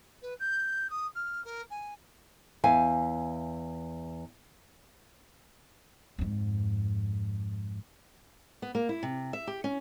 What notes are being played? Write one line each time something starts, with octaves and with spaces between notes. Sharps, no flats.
B4
G6
D#6
F6
A#4
G#5
E2 F5 G#5
F2 G#2
B3
A#3
E4
C3
E5
G4
C#4